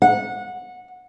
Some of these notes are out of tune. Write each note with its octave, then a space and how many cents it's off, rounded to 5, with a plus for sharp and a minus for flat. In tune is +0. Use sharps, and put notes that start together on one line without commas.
F#5 -20